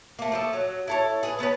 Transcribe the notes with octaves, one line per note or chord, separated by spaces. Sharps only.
A3 A#3
F3 A3 A4
F#3
E4 A4 C#5
G#4 B4
A3 B3 C#4 B4